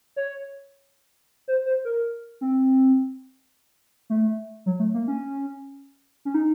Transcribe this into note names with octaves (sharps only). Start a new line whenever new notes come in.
C#5
C5
C5
A#4
C4
A3
F#3
A3
A#3
C#4
C#4
D#4